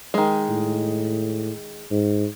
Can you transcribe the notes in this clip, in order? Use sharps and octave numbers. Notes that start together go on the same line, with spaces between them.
D#3 G#3
A2
G#2